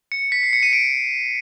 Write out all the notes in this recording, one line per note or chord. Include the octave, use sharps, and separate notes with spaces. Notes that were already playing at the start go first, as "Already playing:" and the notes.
C#7
B6
C7
C#7
D#7
D7